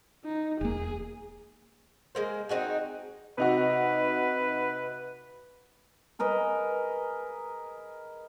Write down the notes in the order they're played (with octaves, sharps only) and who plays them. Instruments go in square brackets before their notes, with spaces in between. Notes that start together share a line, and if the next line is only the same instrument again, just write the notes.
[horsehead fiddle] D#4
[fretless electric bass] E1 A#3 [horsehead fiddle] G#4
[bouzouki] G#3 A#3 C5
C4 D#4 F#4 G#4
[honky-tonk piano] C3 D#4 F#4 [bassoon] B4
[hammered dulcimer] G#4 A#4 B4 D#5